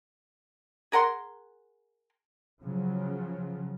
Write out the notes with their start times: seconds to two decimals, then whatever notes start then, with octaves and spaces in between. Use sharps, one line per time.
0.92 G#4 A#4 F#5 C6
2.65 C#3 F3 F#3